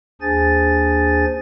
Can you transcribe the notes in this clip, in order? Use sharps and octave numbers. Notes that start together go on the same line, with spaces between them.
D#2 D4 G#4 C5 G#5 A6